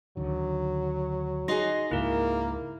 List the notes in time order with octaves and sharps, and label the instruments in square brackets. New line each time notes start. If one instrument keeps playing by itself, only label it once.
[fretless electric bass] D2 D3 D#3 [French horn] F#3
[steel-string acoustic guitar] D#4 F#4 G#4 [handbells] D#5 C6 A#6
[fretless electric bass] C#2 G#2 G#3 [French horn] A#3 [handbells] E4 A#4